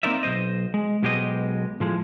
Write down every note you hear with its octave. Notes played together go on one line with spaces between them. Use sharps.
A#3 C4 D#4 A#4 D5 E5
B1 G#2 C5 D#5
G#3
B1 B2 G#3 G4 C5 D#5
A2 F3 G#3